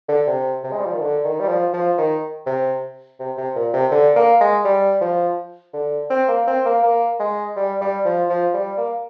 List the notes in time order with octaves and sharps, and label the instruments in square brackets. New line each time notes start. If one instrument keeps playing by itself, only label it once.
[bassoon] D3
C3
C3
G#3
G3
F3
D#3
D3
D#3
G3
F3
F3
D#3
C3
C3
C3
A#2
C3
D3
A#3
G#3
G3
F3
D3
C4
A#3
C4
A#3
A#3
G#3
G3
G3
F3
F3
G3
A#3